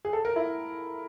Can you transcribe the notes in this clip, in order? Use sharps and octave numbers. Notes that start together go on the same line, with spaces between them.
G#4
A4
A#4
E4